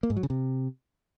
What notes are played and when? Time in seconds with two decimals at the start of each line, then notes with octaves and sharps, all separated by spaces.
0.03 A#3
0.10 G#2
0.17 F#3
0.23 C#3
0.30 C3